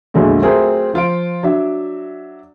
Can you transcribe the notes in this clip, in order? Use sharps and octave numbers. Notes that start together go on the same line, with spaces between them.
A#1 E2 D3 F#3 G#3 A3
F#3 A3 C4 F4 G#4 A#4
F3 F4 F5 D7
F#3 D4 E5